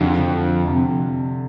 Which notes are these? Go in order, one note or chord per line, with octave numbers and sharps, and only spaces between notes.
F2 D3
C3